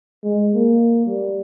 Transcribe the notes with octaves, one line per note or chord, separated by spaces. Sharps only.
G#3
A#3
G3